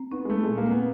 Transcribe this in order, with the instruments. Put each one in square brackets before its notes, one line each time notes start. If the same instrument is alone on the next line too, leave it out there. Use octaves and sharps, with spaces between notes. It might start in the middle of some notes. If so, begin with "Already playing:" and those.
Already playing: [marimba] C4
[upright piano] B3 [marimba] D#4
[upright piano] G#3
[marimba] G3 [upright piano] A3
[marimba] A#2 [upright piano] G#3
[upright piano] A#3
[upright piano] B3 [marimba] C4